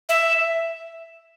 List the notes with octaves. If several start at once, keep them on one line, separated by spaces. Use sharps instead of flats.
E5